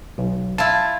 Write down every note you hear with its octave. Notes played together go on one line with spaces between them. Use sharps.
B1
E4 F4 A5